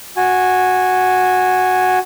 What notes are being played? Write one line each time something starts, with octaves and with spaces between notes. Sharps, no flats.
F#4 G#5